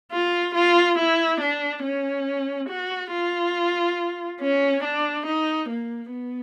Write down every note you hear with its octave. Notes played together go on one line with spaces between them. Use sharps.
F4
F4
E4
D4
C#4
F#4
F4
C#4
D4
D#4
A#3
B3